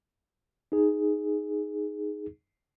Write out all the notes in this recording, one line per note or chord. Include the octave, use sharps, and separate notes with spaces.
D#4 G#4